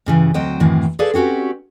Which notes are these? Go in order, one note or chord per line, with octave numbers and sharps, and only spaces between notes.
G2 C#3 E3
D2 F#3 C4 C5 D#5 G5
F#2 A2 D#3 E3 C4
G#4 A4 B4 D5 F5
C4 C#4 F#4 G4 B4